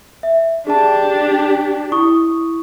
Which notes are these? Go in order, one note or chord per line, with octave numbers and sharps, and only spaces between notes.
E5
D4 G4 G#4 A5
E4 C#6 D#6